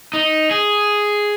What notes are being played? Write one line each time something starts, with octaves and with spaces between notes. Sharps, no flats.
D#4
G#4